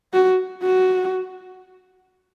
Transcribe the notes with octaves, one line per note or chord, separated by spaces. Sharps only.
F#4
F#4